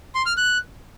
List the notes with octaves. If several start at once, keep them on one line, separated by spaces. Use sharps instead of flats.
C6
F6
F#6